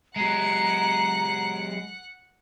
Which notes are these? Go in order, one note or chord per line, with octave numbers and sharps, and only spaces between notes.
F#3 G#3 F#5 A#5